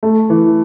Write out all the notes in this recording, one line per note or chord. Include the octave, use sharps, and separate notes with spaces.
A3
E3